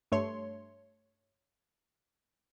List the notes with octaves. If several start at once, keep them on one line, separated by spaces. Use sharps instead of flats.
G2 A3 C#5 C6